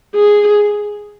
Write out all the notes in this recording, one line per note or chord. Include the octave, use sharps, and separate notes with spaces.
G#4